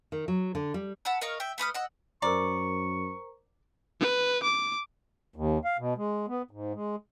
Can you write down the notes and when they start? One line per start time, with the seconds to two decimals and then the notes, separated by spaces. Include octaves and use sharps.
0.12 D#3
0.28 F#3
0.55 D3
0.74 G3
1.05 F#5 A5 B5 E6
1.21 A#4 D#5 F5 C#6
1.40 E5 G5
1.58 A3 B4 D#6 F6
1.74 D#5 F#5 E6
2.22 F#2 A#4 C5 D5 A#5 C#6
4.00 B4
4.43 D6
5.36 D#2
5.65 F5
5.79 B2
5.97 G#3
6.28 B3
6.51 G#2
6.74 G#3